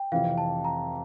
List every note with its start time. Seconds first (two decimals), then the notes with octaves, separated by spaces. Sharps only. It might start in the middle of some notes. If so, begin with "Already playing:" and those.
Already playing: G5
0.12 F1 F2 E3 F5
0.38 A5
0.64 A#5